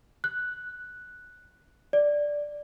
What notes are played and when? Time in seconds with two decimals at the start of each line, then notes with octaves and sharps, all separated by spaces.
0.24 F#6
1.93 D5